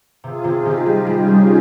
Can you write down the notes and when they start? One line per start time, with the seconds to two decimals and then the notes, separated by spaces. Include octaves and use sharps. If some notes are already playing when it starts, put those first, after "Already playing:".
0.24 C3 F4 G#4
0.44 C3
0.54 D#4 G4
0.65 C3
0.85 G3 F4 G#4
1.07 G3
1.17 C#4 F4
1.28 G3